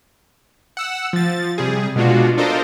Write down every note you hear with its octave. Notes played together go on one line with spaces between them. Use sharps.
F#5 E6
F3 A6
C3 G3 G#4
B2 G#3 D4 F4 F#4
D4 F4 A4 A#4 C5 D#5